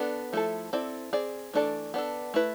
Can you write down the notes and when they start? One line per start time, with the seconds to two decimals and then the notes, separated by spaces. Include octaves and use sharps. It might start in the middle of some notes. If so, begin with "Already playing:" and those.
Already playing: B3 D4 A4
0.33 F3 A3 E4 A4
0.73 C4 E4 A4 D5
1.13 C4 G#4 D5
1.54 E3 A3 D4 A4 D5
1.94 B3 D4 A4
2.34 A3 E4 B4